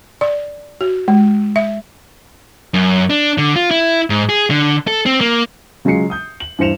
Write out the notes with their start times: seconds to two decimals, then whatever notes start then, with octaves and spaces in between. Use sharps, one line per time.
0.21 D5
0.81 F#4
1.08 G#3
1.56 E5
2.74 F#2
3.10 D4
3.38 D3
3.56 F4
3.71 E4
4.10 G#2
4.29 G#4
4.50 D3
4.87 A4
5.06 C4
5.21 A#3
5.85 C#3 F#3 G#3 F4 C7 C#7
6.10 D#6 G6
6.40 F#7
6.59 G2 E3 C5 C#7 E7 F7